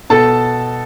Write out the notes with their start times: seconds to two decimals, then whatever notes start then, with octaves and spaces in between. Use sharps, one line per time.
0.10 B2 A4 A5